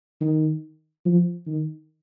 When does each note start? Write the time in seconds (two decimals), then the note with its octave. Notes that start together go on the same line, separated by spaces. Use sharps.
0.21 D#3
1.06 F3
1.47 D#3